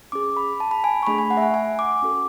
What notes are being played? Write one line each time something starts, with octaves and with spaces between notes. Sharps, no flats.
C#4 G#4 D6
B5
A5
B5
G#5
C#6
A3 D4 G#4 B5
G#5
F#5
E5
F#5
G#5
D6
C#4 F#4 A4